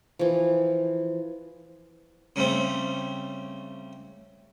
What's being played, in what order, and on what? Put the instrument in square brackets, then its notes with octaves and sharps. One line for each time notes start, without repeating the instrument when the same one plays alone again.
[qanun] E3 F3
[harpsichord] C#3 G3 A3 C4